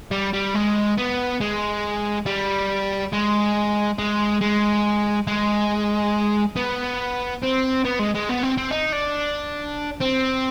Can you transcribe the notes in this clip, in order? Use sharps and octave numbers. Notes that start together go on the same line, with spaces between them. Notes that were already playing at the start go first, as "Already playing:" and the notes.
G3
G3
G#3
B3
G#3
G3
G#3
G#3
G#3
G#3
B3
C4
B3
G#3
G#3
B3
C4
C4
D#4
D4
C4